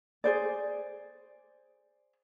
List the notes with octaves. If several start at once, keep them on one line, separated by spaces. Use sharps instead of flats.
G#4 C5 D5